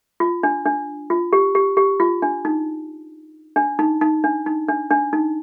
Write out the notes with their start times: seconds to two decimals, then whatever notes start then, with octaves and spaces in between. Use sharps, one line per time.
0.20 F4
0.43 D4
0.65 D4
1.10 F4
1.33 G4
1.55 G4
1.77 G4
2.00 F4
2.22 D4
2.45 D#4
3.56 D4
3.79 D#4
4.01 D#4
4.24 D4
4.46 D#4
4.68 D4
4.90 D4
5.13 D#4